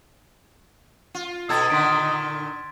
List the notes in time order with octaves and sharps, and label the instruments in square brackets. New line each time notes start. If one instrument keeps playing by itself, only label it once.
[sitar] F4
[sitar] B2 A4 [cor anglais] D#4 [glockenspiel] E6 G#6 A6
[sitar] A#2 D3 D#3 [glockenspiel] C6 B6 D7